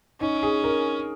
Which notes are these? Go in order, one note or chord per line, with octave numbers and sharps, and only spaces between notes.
C#4 D#4
G#4
A#4